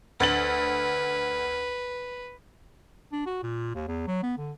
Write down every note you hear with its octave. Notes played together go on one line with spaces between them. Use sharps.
D2 B4 A6 F#7
D4
F#4
A#2
D#2
E2
F#3
B3
D3